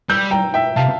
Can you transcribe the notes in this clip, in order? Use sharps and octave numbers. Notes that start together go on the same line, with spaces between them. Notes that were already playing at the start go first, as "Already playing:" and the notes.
G3 E6 G6
G5 A#5
E5 G5
C3 F5 A5